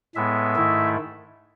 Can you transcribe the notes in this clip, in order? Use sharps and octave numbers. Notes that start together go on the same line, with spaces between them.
A2 G#3 B3 E5
G#2 D#3 A3 E4